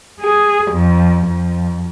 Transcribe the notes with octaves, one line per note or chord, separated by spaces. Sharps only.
G#4
F2
F2